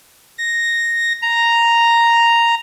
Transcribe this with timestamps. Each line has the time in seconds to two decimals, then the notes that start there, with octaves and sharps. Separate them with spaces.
0.38 A#6
1.22 A#5